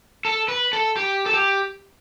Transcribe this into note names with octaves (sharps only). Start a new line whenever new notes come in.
A4
B4
A4
G4
A4
G4